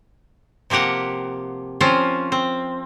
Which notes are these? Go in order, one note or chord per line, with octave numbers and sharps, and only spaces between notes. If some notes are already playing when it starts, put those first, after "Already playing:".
C3 F3 A#3 G4 F#5
F3 C4 C#4 F4
C4